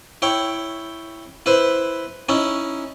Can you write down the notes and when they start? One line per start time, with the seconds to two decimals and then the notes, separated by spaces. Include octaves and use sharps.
0.22 E4 C#5 G5
1.46 E4 B4 C5
2.29 C#4 D#4 E4